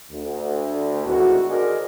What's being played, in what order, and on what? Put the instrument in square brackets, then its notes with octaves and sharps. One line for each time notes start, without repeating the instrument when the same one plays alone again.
[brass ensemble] D2
G#2 D3 D#3 B3 E4 F#4
G#4 A#4 C5 D5 D#5